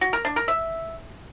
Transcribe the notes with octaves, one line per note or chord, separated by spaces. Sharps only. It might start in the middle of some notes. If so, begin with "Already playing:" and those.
F#4
A#4
D4
A#4
E5